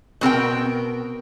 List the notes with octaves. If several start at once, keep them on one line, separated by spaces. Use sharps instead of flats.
B2 C4 A#4 G5